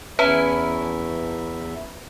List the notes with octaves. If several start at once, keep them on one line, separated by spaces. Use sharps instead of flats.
E2 C#4 E4 B4 E5 A5 A#5